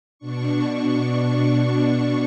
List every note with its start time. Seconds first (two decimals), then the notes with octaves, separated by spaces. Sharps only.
0.18 B2 D4 C#6